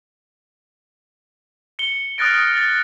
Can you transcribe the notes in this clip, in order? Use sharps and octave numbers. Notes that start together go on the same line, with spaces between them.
C#7 G7
D#6 F6 F#6 A6 A#6 D7
A6